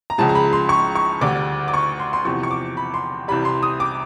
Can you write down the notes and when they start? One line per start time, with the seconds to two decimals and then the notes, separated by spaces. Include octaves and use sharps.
0.10 A#5
0.18 C#2 C#3 F3 G#3 A5
0.29 A#5
0.35 B5
0.53 C6
0.69 C#6
0.95 C#6
1.21 D2 D3 G3 D6
1.68 D6
1.74 C#6
2.00 C6
2.13 C6
2.25 E2 C3 F3 C#6
2.43 C#6
2.51 D6
2.77 B5
2.94 C6
3.28 C2 C3 E3 G3 B5
3.45 C6
3.63 D#6
3.80 D6